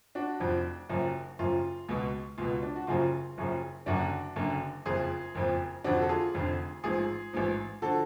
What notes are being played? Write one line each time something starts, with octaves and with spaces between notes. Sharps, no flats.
D4 F#4
F1 F2 F3
F#1 F#2 F3
F#1 F#2 F3 F4
C#2 B2
C#2 B2 F4
D4
F#4
F#1 F#2 C#3 F3 F4
F#1 F#2 C#3 F3
F#1 F#2 D3 D4 F#4
F#1 F#2 D3
F#1 F2 F3 F4 G#4
F#1 F2 F3
F1 F2 D3 F3 D4 F#4
A4
F4 G#4
F1 F2 D3 F3
A1 G#2 F3 F4 G#4
A1 G#2 F3
D3 F3 F#4 A4